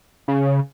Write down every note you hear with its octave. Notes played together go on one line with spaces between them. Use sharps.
C#3